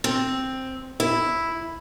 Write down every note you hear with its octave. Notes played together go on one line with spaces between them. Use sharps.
C4
E4